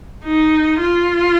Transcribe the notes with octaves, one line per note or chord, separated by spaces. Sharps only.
D#4
F4